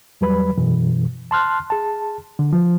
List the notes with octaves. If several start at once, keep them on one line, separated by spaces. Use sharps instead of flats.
E2 F#3 G3 B4 B5
F#2 B2 E3
A5 C6 F6 F#6
G#4 A5
D3
F3